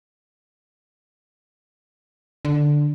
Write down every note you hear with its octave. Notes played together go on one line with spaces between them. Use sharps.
D3